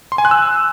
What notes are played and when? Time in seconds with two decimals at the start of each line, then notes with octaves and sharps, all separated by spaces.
0.12 C6
0.18 G#5
0.25 F#6
0.31 E6